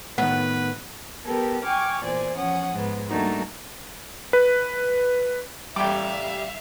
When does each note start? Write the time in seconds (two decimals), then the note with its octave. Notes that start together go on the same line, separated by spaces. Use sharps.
0.18 A2 D#3 B3 B4
1.25 B3 G4 A4 A#4
1.64 G5 G#5 C#6 D6 F6
2.02 E2 A#2 C5 D5 G#5
2.37 F3 C#4 F#5 D#6
2.73 G#2 B3
3.08 G3 A3 A#3 D4 D#4 F#4
4.33 B4
5.76 A1 G3 E5 F5 G5 D6